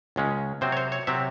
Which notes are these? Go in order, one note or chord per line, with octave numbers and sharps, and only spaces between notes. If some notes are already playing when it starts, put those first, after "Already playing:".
C#2 C#3 G#3 C#4
C3 F#3 C4 C5
C#5
C5
C#5
C3 F#3 C4 E5